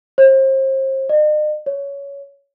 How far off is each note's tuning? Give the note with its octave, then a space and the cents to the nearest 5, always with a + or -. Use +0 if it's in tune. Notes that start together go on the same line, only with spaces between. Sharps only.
C5 +35
D#5 -45
C#5 +15